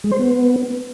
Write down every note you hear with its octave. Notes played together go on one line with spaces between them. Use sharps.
G#3
C5
B3